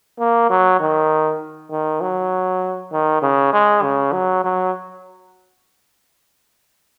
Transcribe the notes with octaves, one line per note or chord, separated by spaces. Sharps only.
A#3
F#3
D#3
D#3
F#3
D#3
C#3
G#3
C#3
F#3
F#3